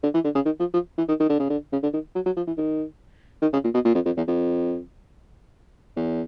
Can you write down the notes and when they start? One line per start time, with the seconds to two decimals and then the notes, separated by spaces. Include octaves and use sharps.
0.03 D3
0.14 E3
0.24 D3
0.35 C#3
0.45 D#3
0.60 F3
0.74 F3
0.98 E3
1.08 D#3
1.20 D#3
1.29 D3
1.39 C#3
1.50 D3
1.72 C#3
1.83 D3
1.93 D#3
2.15 F#3
2.26 F#3
2.36 F3
2.47 E3
2.58 D#3
3.42 D#3
3.53 C#3
3.64 A#2
3.74 B2
3.85 A#2
3.95 F2
4.06 F2
4.17 E2
4.28 F2
5.97 E2